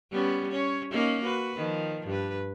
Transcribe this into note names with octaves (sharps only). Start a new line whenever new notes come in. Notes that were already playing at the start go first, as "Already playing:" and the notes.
G3 B3 C#4
C#4 C#5
A#3 C#4 D#4
F#4 B4
D#3 F3
G2 B4